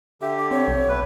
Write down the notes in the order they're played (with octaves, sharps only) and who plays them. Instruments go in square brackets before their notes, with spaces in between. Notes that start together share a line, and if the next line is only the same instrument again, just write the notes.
[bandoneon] D3 G4 [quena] E5
[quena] D6
[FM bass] C4 [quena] C#5
[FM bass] B1
[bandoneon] A3 B4